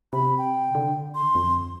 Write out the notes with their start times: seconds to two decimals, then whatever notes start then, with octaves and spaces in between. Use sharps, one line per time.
0.13 C3 B5
0.38 G5
0.75 D3
1.15 C6
1.35 F2